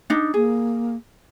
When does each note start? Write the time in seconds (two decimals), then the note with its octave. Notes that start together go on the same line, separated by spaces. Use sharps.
0.10 D4 D#4
0.34 A#3 G#4